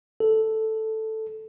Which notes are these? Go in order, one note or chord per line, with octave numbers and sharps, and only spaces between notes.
A4